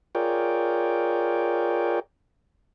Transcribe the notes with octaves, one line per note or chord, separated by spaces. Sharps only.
F4 G#4 A#4 C#5 D5 G5